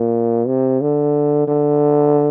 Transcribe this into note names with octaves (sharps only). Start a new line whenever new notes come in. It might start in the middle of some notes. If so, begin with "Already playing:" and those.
Already playing: A#2
C3
D3
D3